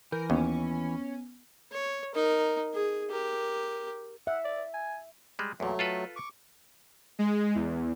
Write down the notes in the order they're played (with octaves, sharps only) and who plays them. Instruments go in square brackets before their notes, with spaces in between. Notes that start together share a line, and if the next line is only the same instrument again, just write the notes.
[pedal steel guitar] E3 [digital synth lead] A#4 [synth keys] G6
[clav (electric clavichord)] D#2 [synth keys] B3 [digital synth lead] C#4
[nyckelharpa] C#5
D#4 A#4
G#4
G4 A#4
[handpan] E5 [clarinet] F#5
[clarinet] D5
G#5
[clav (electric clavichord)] G3 G#3
[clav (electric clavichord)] E2 A#2 [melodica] F#3 A3
[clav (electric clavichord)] F4 A4 B4
[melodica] C#6 D6
[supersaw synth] G#3
E2